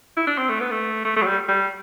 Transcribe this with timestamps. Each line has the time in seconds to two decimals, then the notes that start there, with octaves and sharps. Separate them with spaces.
0.17 E4
0.27 D4
0.38 C4
0.49 A3
0.60 B3
0.71 A3
1.05 A3
1.16 A3
1.22 F#3
1.27 G3
1.48 G3